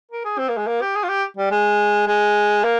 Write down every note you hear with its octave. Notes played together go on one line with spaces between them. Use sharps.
A#4
G#4
C4
A#3
G#3
A#3
G4
G#4
F4
G4
G3
G#3
G#3
A#3